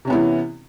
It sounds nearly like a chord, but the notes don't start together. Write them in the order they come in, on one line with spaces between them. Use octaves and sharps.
C3 C#4 B3 E4 E3